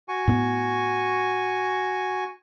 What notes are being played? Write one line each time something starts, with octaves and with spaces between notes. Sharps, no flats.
F#4 G#5 C#6
A2 B3